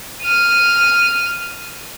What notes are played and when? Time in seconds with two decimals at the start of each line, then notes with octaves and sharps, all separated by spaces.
0.22 F6 D#7